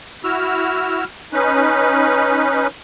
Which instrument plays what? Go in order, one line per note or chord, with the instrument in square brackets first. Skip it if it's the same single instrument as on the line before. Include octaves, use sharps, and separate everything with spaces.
[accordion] E4 F#4 E6 F6
C#4 D#4 B4